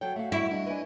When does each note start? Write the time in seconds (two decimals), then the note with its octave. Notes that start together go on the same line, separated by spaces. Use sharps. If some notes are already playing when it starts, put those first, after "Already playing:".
0.01 F#3 A4 C#5 G5
0.16 A3 F#4 E5 F5
0.32 G3 E4 C#6
0.51 D4 D#5
0.66 B4 D5 G#5